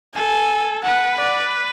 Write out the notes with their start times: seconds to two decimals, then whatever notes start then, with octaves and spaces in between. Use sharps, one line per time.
0.15 A4 G#5
0.84 B4 F#5
1.18 D5